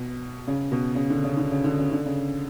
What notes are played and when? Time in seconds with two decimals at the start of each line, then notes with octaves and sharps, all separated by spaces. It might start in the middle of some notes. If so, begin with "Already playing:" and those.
Already playing: B2
0.47 C#3
0.72 B2
0.95 C#3
1.10 D3
1.24 C#3
1.37 D3
1.51 C#3
1.64 D3
1.78 C#3
1.92 D3
2.06 C#3